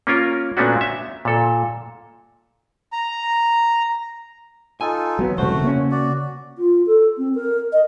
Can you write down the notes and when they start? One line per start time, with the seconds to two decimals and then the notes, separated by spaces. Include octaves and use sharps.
0.07 A#3 C#4 F4 A#4
0.57 A#2 A3 B3 C#4 D4 F#4
0.81 E5
1.25 A#2 A4
2.93 A#5
4.81 D#4 F4 A4 G#5
5.19 F#3 B3
5.38 E1 C2 F#2 C#3 A3 F#4 C5
5.64 A#3 C#4
5.91 F#4 D5
6.58 F4
6.86 A4
7.17 C4
7.35 A#4
7.73 D#5